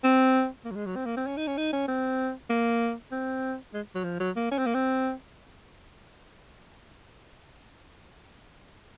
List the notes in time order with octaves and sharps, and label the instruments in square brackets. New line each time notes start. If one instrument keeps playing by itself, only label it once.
[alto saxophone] C4
A#3
F#3
G#3
F#3
C4
A#3
C4
C#4
D#4
C#4
D#4
C#4
C4
A#3
C4
G#3
F#3
F3
F#3
A#3
C#4
C4
A#3
C4